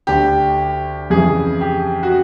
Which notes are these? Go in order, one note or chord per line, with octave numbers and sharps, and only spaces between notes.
D2 D3 G4
F2 C#3 E3 G#4
G4
F#4